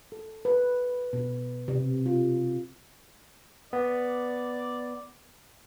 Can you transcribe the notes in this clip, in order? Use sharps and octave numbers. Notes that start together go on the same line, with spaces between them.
A4
B4
B2
C3
F4
B3 D5